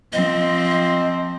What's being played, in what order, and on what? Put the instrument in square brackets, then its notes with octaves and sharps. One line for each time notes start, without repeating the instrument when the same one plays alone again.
[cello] F3 C4 [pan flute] D#5